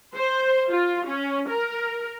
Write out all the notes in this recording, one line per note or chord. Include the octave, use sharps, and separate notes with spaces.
C5
F4
C#4
A#4